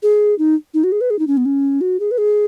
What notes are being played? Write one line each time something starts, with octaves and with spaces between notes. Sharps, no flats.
G#4
D#4
D#4
F#4
G#4
B4
G#4
D#4
C#4
B3
C#4
F#4
G#4
B4
G#4